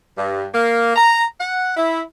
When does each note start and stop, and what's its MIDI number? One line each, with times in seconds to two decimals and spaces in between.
0.18 0.47 43
0.55 0.94 58
0.96 1.24 82
1.40 1.73 78
1.77 2.01 64